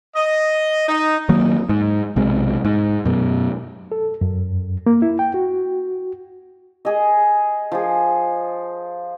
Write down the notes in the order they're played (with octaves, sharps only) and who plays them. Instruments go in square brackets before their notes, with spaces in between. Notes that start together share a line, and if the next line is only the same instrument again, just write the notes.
[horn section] D#5
D#4
[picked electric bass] D#3 F#3 A#3
G#2
B1 C3 G#3
G#2
F#2 B2
[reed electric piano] A4
F#2
A#3
E4
G5
F#4
[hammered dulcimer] G#4 D#5
F3 G#4